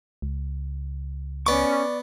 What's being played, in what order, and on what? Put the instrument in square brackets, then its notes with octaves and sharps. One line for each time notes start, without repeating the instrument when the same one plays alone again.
[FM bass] C#2
[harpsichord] B3 D6 [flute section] C#4 [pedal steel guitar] D5 C#6